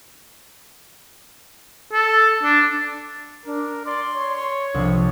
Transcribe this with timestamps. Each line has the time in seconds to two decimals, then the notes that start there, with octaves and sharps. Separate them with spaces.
1.93 A4
2.43 D4
3.46 D4 A#4
3.86 D5 C6
4.16 C#5
4.74 C2 F3 D4